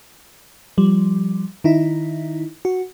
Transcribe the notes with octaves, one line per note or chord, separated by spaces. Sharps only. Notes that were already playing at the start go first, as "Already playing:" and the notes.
F3 G3
D#3 D#4 E4
F#4